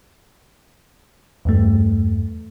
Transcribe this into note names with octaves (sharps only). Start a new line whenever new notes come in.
E2 G2 A3